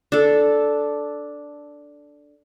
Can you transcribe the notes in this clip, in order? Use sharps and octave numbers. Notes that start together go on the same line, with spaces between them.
D4 A4